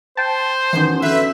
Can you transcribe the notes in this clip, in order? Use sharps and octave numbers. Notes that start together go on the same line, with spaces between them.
C5 G5 A5
F#2 D#3 E3 F#3 B3
D3 B4 E5